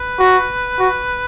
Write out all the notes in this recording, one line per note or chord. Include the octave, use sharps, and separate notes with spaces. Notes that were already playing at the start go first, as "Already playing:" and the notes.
Already playing: B4
F#4
F#4